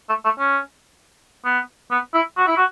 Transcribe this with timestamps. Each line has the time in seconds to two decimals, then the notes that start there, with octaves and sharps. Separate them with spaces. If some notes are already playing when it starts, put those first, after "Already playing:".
0.09 A3
0.24 A3
0.39 C#4
1.45 B3
1.91 B3
2.14 E4
2.37 F#4
2.47 E4
2.57 F#4